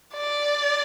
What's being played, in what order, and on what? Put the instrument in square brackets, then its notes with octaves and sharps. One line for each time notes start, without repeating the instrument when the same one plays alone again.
[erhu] D5